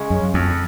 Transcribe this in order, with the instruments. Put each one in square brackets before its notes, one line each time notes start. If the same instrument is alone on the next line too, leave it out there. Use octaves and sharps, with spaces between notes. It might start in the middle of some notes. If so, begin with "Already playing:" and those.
Already playing: [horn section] C#3 G#3 C#4
[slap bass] F#2
F2